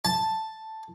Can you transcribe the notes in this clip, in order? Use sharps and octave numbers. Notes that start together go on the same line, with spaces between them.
A5